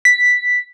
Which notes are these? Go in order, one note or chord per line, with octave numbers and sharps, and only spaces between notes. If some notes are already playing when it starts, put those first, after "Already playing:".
B6